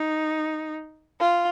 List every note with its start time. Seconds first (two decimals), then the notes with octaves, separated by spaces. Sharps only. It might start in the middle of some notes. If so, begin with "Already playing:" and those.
Already playing: D#4
1.20 F4